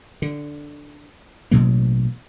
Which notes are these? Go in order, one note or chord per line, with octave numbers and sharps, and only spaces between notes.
D3
A1 B2 F#3 A#3